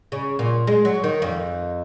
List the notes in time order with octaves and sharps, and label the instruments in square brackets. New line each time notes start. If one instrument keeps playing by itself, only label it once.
[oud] C#3
A#2
G#3
F#3
D#3
F2